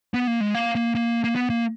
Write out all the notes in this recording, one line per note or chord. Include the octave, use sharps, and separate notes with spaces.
B3
A#3
G#3
A#3
A#3
A#3
A#3
B3
A#3